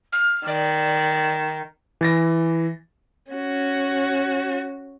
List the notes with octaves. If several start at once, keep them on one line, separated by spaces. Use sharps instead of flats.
F6
D#3 D5
E3 A6 A#6
C#4 F#4